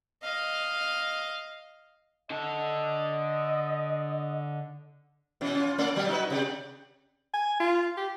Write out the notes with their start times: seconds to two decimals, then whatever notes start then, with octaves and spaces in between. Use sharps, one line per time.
0.23 D#5 F5
2.31 D3 D#5 A5
5.41 B2 E3 C#4
5.55 C#4 F4
5.78 A3 C#4 D5
5.95 B2 F#3 G4
6.08 D#4 F#4 B4
6.30 C3 G4 D5
7.34 G#5
7.60 F4
7.97 G4